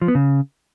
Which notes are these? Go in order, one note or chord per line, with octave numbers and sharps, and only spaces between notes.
F3
B3
C#3